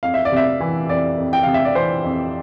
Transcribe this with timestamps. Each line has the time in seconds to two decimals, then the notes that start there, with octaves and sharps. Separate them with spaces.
0.03 F2 F5
0.14 E5
0.25 D5
0.32 C3 E5
0.60 E3
0.89 F2 D5
1.18 F2
1.33 G5
1.43 C3 F5
1.54 E5
1.65 D5
1.75 E3 C5
2.04 F2